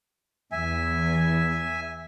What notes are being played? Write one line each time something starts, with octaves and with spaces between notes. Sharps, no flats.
E2 E5 G#5